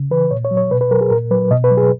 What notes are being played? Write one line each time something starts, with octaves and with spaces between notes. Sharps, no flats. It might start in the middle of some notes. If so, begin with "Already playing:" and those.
Already playing: C#3
E3 B4
A#2 C#5
C#5
F#3
C#5
B2 B4
B4
F#3 A#4
G#4
A#2 A#4
F#3 B4
B2 D#5
B4
F#3
G#4